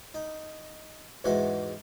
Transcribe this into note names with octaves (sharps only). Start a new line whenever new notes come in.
D#4
E2 G#2 E3 G#3 F#4 F#5